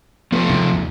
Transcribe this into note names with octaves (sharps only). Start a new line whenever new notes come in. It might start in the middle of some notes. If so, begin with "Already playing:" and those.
F3 A3 B3
C3 D#3 G#3
D#2 A#2 D#3